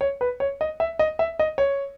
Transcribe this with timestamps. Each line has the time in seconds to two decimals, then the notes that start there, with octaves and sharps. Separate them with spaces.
0.01 C#5
0.21 B4
0.40 C#5
0.61 D#5
0.80 E5
0.99 D#5
1.19 E5
1.39 D#5
1.58 C#5